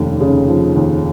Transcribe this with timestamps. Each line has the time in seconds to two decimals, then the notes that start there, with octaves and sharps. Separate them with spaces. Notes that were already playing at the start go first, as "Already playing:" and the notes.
Already playing: F1 D#2 F3
0.21 C#3
0.48 F3
0.76 D#2